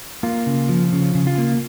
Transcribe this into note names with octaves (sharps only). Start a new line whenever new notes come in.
A#3 F4
C#3
F3
C#3
C#3
F4
A#3